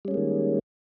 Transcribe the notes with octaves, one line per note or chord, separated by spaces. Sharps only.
D#3 G3 G#3 A#3 C#4